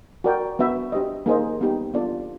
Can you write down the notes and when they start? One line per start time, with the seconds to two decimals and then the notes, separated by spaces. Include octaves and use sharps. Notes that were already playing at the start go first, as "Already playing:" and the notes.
0.24 F#4 A#4 D5 G5
0.59 B3 D4 F#4 B4 E5
0.92 D4 G4 C5 D#5
1.26 A#3 D#4 G#4 C5 D#5
1.61 B3 D#4 G4
1.94 B3 D4 F4 A4 D5